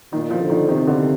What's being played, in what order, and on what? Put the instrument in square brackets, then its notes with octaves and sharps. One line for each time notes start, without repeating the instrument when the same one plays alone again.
[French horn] A#2 [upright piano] D#3
[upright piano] F3
[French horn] D3
[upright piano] D#3
[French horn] C3 [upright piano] D#3
[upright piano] D3